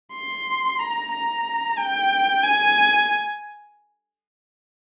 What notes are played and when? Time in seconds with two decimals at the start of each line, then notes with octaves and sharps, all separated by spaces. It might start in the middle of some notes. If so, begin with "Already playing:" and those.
0.13 C6
0.79 A#5
1.12 A#5
1.78 G5
2.43 G#5